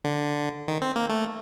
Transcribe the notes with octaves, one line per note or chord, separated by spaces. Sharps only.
D3
D#3
C4
A#3
A3